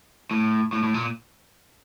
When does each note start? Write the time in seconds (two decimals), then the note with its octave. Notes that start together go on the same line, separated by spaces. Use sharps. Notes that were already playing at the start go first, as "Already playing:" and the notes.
0.31 A2
0.73 A2
0.84 A2
0.94 A#2